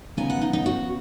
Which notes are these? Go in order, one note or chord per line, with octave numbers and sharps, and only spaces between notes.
C#3 B3 D#4 G#5
F#5
D#4
D#4
F#4